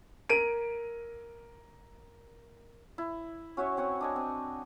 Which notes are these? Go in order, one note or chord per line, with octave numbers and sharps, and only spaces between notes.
A#4 D7 D#7
E4
C#4 F#4 C#5 E5
C4 C#5 F#5 G#5
D4 D#5 G#5
C4